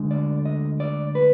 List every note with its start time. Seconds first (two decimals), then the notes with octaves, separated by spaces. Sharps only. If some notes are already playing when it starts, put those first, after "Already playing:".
Already playing: D2 D3 G#3
0.11 D5
0.45 D#5
0.80 D5
1.15 B4